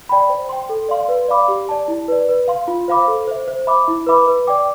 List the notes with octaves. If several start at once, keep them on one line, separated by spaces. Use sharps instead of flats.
D5 G5 B5
C5
G5 C6
A4
D5 F5 C6
B4
D5 F5 B5 D6
G4
D5 A5
E4
B4 D5
B4
F5 C6
F4
C5 F5 B5 D6
A4
C5 E5
C5
E5 B5 D6
E4
B4 E5 B5 D6
B4
D5 G5 D6